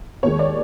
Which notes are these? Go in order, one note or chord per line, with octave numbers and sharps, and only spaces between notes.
D#2 D#3 G#3 C#5
D5